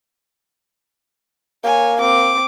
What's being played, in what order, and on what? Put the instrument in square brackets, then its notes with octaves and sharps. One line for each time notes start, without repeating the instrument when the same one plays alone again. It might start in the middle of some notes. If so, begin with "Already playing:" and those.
[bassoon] A#3 [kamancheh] C#5 G#5
[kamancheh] C4 D6